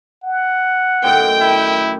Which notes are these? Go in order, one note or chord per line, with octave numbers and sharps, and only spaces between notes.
F#5
F#2 A2 D#3 G5
E4